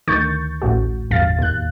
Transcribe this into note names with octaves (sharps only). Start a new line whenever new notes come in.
D2 D#3 C#6 G6 A6
A1 A2 F#4
G1 E2 F5 A6
D#2 F#6